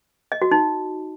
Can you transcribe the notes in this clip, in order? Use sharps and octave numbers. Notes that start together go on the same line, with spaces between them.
D#5
F#4
D#4